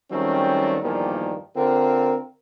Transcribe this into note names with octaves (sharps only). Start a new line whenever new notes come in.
D#3 F#3 G3 A3 C4 C#4
E2 G2 A#2 D#3 F3 A#3
D3 C4 F4 A#4